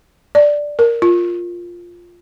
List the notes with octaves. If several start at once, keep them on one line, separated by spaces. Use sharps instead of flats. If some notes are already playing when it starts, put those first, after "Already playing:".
D5
A#4
F4